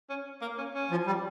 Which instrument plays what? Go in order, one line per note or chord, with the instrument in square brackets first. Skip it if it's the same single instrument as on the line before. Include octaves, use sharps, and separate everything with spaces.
[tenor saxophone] C#4
A#3
C#4
C#4
[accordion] F3
G3